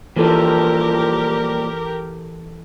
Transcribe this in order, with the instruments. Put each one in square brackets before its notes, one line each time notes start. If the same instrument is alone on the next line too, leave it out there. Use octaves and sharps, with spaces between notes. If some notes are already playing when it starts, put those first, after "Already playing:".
[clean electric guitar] A#2 F3 G3 [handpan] E3 A4 [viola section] G4 A#4